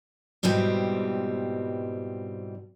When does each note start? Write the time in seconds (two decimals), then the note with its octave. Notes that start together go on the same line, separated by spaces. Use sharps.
0.43 G#2 B2 E3 G3 C4